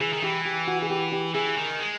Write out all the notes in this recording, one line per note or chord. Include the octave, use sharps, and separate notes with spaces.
E3 G#4
D#3
E3 G4
G4
F#4
G#4
G4
G4
E3 G#4
D#3
G#3